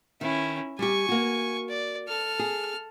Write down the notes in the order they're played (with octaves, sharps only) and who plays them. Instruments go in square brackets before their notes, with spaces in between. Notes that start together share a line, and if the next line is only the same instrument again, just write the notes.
[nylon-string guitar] D#3 [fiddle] C#4 E4
[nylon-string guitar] G3 G4 [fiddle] G#5 C#6
[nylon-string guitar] A#3 F#4
[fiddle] D5
A4 F6
[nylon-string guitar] G#4